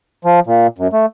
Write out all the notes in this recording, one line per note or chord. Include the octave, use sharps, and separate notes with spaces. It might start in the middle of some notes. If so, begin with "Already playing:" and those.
F3
A#2
F#2
A3